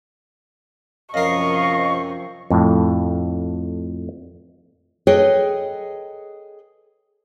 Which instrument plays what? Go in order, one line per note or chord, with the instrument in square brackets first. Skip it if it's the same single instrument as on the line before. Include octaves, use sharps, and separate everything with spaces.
[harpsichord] F#2 A#4 [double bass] C3 F3 [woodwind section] D#5 F5 [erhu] C#6
[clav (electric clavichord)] F2 A2
[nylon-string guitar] G#4 A4 B4 C#5 D#5 G5